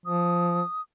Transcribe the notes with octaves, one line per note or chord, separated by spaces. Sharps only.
F3 D#6